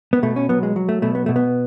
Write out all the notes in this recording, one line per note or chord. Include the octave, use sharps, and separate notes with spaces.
B3
B2 A3
C#4
F#3 B3
G#3
F#3
A3
B2 A3
B3
B2 A3
B3